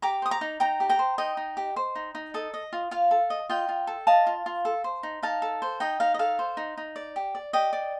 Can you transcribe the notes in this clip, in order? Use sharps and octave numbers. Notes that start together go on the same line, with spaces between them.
G4 A#5 D6
C5 D#6
A#5 D6
D#4
D#4 G5 A#5
G4
G5 A#5
C5
D#4 D#5 G5
D#4
G4
C5
D#4
D#4
A4 D#5
D#5
F4
F4 F5
A4
D#5
F4 D#5 G5
F4
A4
D#5 F5 A5
F4
F4
A4
C5
D#4
D#4 F5 A5
A4
C5
D#4 D#5 G5
D#4 F5
D#5
A4 F5
C5
D#4
D#4
D5
G4
D5
G4 D#5 G5
D5